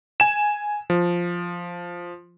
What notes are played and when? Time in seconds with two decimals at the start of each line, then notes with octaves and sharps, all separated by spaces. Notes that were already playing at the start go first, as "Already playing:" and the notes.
0.20 G#5 E7
0.90 F3